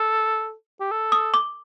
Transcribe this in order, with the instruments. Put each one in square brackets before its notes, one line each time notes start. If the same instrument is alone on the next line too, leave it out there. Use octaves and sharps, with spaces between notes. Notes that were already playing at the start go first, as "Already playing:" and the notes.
Already playing: [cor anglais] A4
G4
A4
[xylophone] D#6
D6